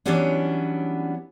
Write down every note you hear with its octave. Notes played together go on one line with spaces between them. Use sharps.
E3 F#3 G3 B3 C#4 D4